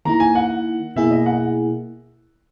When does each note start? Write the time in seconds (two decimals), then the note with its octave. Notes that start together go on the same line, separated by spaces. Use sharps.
0.05 D#3 A#3 E4 A#5
0.20 G#5
0.35 F#5
0.96 B2 A#3 E4 G#4 E5
1.11 D#5
1.26 F#5